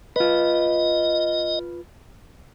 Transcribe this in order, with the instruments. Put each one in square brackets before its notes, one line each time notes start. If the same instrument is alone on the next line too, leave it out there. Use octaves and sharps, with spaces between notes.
[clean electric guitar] F4 B4 [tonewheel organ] D#5